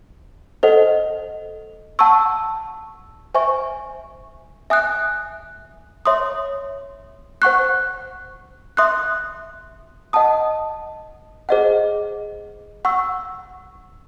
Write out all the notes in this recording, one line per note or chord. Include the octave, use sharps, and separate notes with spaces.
A4 C5 D#5 F#5
F#5 A5 C#6 E6
C5 E5 G#5 C#6
E5 G#5 D#6 F#6
C#5 E5 C6 D#6
C5 F#5 C#6 F#6
E5 C6 D#6 F#6
D#5 F#5 A5 D#6
G#4 C5 D#5 F#5
F#5 C#6 E6